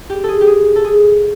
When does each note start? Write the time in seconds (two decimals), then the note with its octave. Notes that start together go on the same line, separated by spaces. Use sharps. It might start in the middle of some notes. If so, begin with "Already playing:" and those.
0.10 G4
0.24 G#4 A4
0.41 G4
0.47 G#4
0.76 A4
0.85 G#4